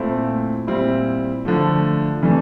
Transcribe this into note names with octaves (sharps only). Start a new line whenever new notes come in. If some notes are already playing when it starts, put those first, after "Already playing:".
Already playing: A#2 A3 C4 E4
A#2 G3 C4 E4
D3 F3 A3
C3 E3 A3 D4